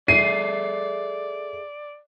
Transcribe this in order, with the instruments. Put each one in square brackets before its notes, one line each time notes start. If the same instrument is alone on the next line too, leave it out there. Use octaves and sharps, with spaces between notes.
[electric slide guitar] G#4 A4 E5 [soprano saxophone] D5 [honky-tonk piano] C7 D#7